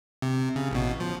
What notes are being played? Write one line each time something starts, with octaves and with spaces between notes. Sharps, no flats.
C3
C#3
A1 B2
F3